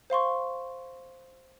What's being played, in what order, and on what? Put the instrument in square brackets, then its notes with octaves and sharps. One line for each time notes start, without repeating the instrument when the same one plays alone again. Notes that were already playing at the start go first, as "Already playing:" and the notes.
[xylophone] C5 F5 C6 C#6